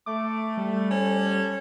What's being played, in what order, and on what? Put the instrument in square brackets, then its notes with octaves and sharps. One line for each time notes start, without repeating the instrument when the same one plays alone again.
[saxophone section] A3 [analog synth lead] D6
[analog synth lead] G3
[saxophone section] C#4 A4 C5